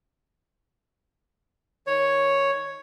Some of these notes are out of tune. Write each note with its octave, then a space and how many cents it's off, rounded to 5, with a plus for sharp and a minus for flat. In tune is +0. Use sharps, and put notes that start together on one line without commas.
D#3 +0 C#5 +0